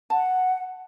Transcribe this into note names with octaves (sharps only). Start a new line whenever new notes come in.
F#5 A5